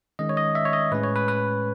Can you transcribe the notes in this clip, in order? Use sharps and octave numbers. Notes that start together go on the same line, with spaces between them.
D#3 G#3 C#4 D#5
C#5
D#5
E5
C#5
D#5
A2 G#3 C#4 B4
C#5
B4
B4